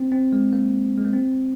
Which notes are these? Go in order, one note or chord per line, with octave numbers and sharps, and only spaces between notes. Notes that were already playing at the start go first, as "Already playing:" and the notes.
Already playing: C4
C4
G#3
A#3
G#3
A#3
C4